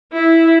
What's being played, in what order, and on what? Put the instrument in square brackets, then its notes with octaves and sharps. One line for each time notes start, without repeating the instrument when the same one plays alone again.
[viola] E4